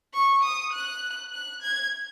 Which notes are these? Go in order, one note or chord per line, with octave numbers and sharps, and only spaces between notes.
C#6
D#6
F#6
F#6
G#6